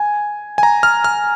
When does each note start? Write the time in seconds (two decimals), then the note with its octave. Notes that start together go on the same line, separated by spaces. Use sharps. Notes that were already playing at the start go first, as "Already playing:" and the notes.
Already playing: G#5
0.58 G#5
0.63 A#5
0.83 F6
1.04 F6